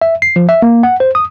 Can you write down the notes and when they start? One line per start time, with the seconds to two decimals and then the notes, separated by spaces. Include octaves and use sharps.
0.02 E5
0.22 C7
0.36 F3
0.49 E5
0.62 A#3
0.83 F#5
1.00 C5
1.15 D#6